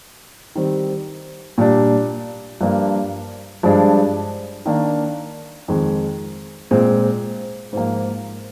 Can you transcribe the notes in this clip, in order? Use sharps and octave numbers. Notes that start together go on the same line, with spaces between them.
D#3 G3 C4
A#2 G3 D4
G2 F3 A#3 D4
G2 F3 G#3 D4
D#3 A#3 D4
F2 D#3 G#3
A#2 G#3 C4
G#2 F3 A#3